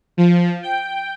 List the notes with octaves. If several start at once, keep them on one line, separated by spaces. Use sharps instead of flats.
F3
G5